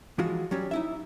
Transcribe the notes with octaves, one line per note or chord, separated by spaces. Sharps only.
E3 F3 G#3 F4 F#4
F#3 G3 C#4 G4
D#4 E4 E5